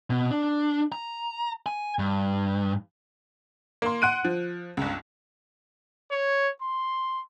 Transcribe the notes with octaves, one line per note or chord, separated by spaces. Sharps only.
B2
D4
A#5
G#5
G2
A#3 C6
F#5 C6 F#6 D7 D#7
F3
G1 C#2
C#5
C6